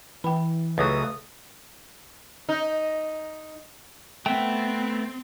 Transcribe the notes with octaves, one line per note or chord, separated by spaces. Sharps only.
E3 G5 B5
C#2 F#3 A3 B4 D#6
D#4
A3 B3 C4 G5